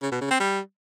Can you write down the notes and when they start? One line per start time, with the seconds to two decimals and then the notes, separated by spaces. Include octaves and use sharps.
0.02 C#3
0.12 B2
0.21 C#3
0.31 C4
0.40 G3